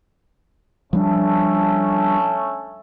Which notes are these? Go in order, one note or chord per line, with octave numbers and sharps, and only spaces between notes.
F3 G3 A3 C#4 D4 A4